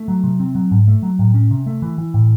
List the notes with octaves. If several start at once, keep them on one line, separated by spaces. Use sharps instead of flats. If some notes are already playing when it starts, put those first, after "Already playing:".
Already playing: A3
F#3
C3
C4
F#3
G#2
A3
F#3
A2
C#4
C3
A3
E3
E3
A2